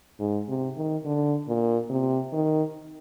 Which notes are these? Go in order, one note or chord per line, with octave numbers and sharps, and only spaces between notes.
G#2
C3
D#3
D3
A#2
C3
D#3